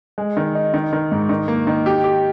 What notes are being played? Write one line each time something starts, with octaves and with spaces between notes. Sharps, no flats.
G#3
D#3
D#4
D#3
D#3
G#2
D#3
A#3
D#3
G4
G4